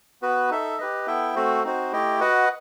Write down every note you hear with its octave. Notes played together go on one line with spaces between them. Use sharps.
B3 F#4 B4
D#4 A4 E5
G4 B4 D#5
B3 E4 A4 E5 G5
A3 C4 F#4 A4 C5
C4 D#4 F#4 C5
A3 E4 G4 D#5 G5
F#4 B4 D#5 F#5